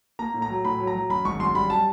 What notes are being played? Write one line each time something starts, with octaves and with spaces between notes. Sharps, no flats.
A#3 A#5
A2
A#5
F#3
A2 B5
F#3
A#5
F#3
F#2 B5
G#1 C#6
F#2 C6
G3 B5
G3 A5